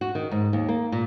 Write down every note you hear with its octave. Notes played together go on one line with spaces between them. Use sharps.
F#4
D#3
G#2
D#2
A#3
A#2